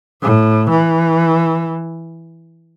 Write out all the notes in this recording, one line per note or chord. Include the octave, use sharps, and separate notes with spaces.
A2
E3